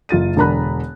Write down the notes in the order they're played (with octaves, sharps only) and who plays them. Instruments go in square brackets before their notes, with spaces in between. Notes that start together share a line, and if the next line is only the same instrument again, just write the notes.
[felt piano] F#1 F4 A6 D#7
E1 D3 A#4 A#5 B5 F#6